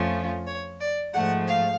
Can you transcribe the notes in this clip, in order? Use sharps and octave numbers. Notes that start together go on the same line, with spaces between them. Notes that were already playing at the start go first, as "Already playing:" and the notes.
Already playing: F2 F3 A3 C#4 F4
C#5
D5
G#2 F3 A3 F#5
F5